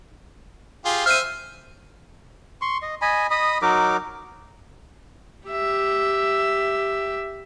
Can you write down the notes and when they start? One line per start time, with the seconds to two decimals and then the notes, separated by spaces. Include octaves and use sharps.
0.85 F4 G4 G#4
1.06 C5 E5 F6 D#7
2.62 C6 C#6
2.82 D#5
3.02 D#5 G#5 B5
3.31 D#5 B5 D#6
3.62 F#3 D#4 A#4 D6
5.49 G4 E5